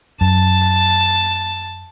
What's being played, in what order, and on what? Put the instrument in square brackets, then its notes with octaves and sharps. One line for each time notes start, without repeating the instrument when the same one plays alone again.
[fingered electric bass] F#2 [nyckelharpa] A5